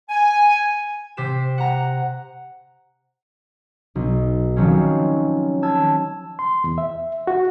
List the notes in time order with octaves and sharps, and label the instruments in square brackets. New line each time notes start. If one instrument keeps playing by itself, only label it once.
[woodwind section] G#5
[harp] C3 C5 D6 B6 E7
F#5 A#5
B1
D#3 F3 F#3 C4 C#4
A5 E6 G#6
[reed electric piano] C6
E2
E5
F#4